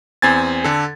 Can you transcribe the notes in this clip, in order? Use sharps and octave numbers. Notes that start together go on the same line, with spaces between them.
E2 C4 G#5 G#6 A6
D3 A4